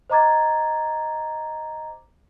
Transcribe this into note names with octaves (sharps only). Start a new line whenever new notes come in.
C5 D#5 A#5 D6 G#6 A6